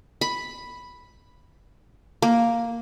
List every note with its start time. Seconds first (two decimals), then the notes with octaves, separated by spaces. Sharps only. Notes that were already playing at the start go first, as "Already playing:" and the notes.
0.21 B5
2.22 A#3